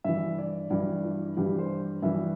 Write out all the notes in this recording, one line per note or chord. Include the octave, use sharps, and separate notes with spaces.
G2 E3 E5
D5
G2 E3 D5
E4
G2 E3 G4
C5
G2 E3 E5